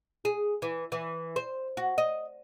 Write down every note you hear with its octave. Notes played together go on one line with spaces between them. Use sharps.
G#4
E3
E3
C5
F#4
D#5